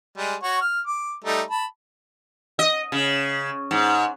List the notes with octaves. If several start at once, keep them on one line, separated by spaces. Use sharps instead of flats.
G3 G#3
F#4 C#5
F6
D6
G3 A3 D#4
A5 B5
D#5
C#3
G#2